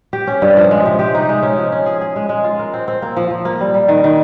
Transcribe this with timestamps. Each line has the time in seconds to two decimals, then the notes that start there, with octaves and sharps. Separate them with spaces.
0.13 G4
0.27 C#4
0.42 G2
0.57 F3
0.71 G#3
0.86 C3
0.99 G4
1.15 D#4
1.29 G#3
1.42 C#4
1.58 F3
1.72 C#4
1.86 G#4
2.01 G#4
2.16 G#3
2.29 G#3
2.44 F4
2.59 A#4
2.73 C4
2.88 C4
3.02 A#3
3.17 F3
3.31 F3
3.45 A#3
3.61 G3
3.74 G3
3.88 D#3
4.04 D#3